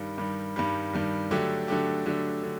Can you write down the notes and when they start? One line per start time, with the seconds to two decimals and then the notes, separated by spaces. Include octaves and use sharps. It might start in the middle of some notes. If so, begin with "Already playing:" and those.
Already playing: G2 D#3 G3
0.18 G2 D#3 G3
0.56 G2 D#3 G3
0.93 G2 D#3 G3
1.31 D3 F#3 A3 D4 G4
1.68 D3 F#3 A3 D4 G4
2.06 D3 F#3 A3 D4 G4
2.43 D3 F#3